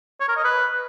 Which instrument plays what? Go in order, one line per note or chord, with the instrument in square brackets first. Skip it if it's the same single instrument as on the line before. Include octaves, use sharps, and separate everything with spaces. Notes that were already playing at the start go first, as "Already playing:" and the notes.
[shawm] C#5
A#4
D#5
B4